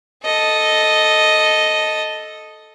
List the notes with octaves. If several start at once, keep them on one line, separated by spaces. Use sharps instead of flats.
A4 D#5